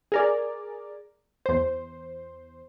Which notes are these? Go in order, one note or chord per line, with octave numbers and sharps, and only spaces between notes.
G#4 A#4 D5
E2 C5